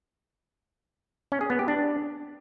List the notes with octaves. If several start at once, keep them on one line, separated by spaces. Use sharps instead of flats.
C#4
G#4
B3
G4
D4